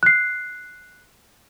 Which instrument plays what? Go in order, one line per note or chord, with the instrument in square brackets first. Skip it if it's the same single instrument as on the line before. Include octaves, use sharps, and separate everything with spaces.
[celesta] F#6 C7